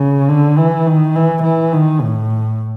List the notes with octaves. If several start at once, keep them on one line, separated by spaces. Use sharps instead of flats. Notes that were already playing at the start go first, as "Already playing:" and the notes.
Already playing: C#3
D3
E3
D#3
E3
E3
D#3
A2